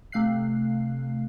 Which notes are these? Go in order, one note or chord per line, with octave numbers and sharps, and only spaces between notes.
C3 A3 F5 F#6 C7